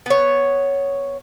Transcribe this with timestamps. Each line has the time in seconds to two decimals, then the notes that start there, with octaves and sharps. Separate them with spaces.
0.06 B3 C#5